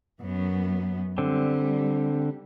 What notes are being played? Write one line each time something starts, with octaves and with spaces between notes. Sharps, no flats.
F#2 B3
D3 G3 C4